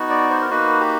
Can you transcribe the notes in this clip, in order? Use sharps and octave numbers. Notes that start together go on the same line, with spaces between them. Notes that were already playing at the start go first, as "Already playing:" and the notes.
Already playing: B3 D#4 F#4
D5
C5
A#4
A#3 D#4 F#4 B4
G4